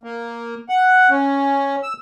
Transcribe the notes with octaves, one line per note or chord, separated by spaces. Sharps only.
A#3
F#5
C#4
E6